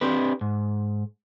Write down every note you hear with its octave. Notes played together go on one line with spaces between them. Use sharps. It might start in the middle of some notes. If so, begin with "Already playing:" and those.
C4 D4 G4 B4
G#2